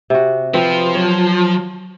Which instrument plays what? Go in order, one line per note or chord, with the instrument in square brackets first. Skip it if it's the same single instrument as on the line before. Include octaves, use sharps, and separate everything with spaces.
[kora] C3 F#4
[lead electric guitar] F3 [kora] C4 [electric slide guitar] B4
[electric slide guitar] F#3 [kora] C#5